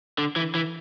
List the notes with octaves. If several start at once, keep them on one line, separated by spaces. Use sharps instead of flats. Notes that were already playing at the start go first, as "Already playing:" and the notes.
D3
E3
E3